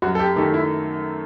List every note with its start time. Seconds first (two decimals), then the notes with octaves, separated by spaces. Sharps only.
0.02 F#2 F#4
0.15 A4
0.19 G4
0.36 D#3 A3 D#4 G4 A4
0.54 E4